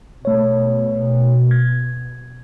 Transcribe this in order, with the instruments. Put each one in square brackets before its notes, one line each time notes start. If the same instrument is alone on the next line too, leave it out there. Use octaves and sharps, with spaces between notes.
[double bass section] B2 [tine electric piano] A3 C#5
[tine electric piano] G#6